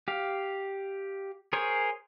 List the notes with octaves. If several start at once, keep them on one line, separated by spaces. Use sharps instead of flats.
G4 F5
G#4 A#4 C5 C#5